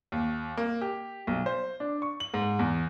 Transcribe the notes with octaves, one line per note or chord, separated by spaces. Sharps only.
D#2
A#3
G4
B1
C5
D4
C#6
F#7
G#2
E2